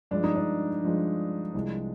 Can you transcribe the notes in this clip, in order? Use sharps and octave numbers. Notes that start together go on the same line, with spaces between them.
G2 F3 G#3 D4
D#4
D4
G2 F3 G#3
C2 C3 F3 G#3